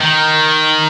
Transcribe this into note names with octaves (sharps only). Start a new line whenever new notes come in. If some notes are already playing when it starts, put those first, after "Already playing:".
D#3